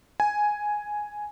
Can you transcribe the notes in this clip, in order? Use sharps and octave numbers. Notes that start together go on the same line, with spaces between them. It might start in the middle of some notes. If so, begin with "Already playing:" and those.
G#5